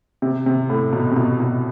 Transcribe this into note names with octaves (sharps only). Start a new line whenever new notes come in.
C3
C3
A2
B2
C3
B2
B2